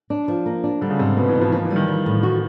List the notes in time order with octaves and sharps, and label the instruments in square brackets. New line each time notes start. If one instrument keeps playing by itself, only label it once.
[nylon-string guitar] D4
F3
A#3
D4
[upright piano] D3 [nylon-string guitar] G3
[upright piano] C#3
[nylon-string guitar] G#2 [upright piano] C3
[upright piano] B2 [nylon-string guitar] B3
[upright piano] E3
[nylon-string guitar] G#2
[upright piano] F3
[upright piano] F3 [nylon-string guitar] A#3
[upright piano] E3
[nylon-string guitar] G3
[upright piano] D#3
[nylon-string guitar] G3
A2
F#4